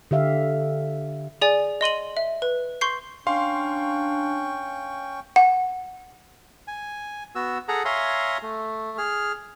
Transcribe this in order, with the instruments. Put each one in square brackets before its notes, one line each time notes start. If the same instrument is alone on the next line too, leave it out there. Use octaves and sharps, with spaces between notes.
[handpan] D3 G4 E5 F5
[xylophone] G#4 D5 G#5
D#5 C6 D#7 F#7
E5
B4
C6 C#6 G6 C7
[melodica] C#4 G5 C#6 [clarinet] D4 [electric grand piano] F5 C6
[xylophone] F#5
[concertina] G#5
B3 F#4 E6
G#4 A4 F#5 A#5
C#5 E5 F5 G#5 A#5 C6
A3
G#4 F6